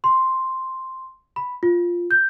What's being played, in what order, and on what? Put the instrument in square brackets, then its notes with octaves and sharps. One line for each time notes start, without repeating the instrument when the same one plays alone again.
[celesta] C6
B5
F4
G6